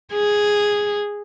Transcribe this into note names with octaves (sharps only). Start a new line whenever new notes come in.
G#4